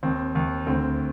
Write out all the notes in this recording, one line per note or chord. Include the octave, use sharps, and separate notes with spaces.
D#2 C4
D#2
D2 C4